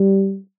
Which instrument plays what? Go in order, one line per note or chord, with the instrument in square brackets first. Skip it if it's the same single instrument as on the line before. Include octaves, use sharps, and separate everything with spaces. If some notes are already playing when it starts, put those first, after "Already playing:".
Already playing: [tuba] G3